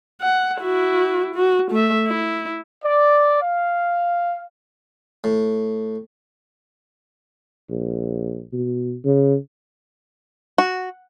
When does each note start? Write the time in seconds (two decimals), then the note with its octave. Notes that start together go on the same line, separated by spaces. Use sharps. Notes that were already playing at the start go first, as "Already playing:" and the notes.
0.21 F#5
0.59 E4 F#4
1.35 F#4
1.71 A3 E5
2.06 E4
2.84 D5
3.42 F5
5.24 A2
7.70 A#1
8.53 B2
9.05 C#3
10.58 F#4